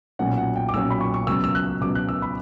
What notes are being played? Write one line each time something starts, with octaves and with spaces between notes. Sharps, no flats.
B1 A#2 F#3 C#4 F#5
F#5
G5
D6
B1 A#2 F#3 C#4 E6
B5
C#6
C#6
C#2 B2 F#3 E6
E6
F#6
C#2 B2 F#3 D6
F#6
E6
B5